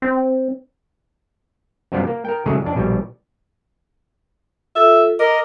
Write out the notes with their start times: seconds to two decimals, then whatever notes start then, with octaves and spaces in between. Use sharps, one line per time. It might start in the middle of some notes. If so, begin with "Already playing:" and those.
0.02 C4
1.92 F#2 C3 G3 B3 F4
2.07 A#3
2.25 A#4 G5
2.46 C#3 F#3 G#3 A3 G#4
2.62 F2 D4
2.75 A#1 B2 G3
4.75 F4 A4 E5
5.19 A#4 D#5 D6